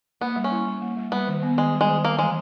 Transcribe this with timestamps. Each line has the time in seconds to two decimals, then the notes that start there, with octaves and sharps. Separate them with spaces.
0.21 A#3 B3
0.36 G3
0.44 C#4
0.52 E4
0.67 G3
0.82 A#3
0.97 G3
1.12 G3 B3
1.28 D#3
1.43 B3
1.58 D#3 G#3
1.74 G3
1.81 G#3
1.89 D#3
2.04 G3 A#3
2.19 E3 G#3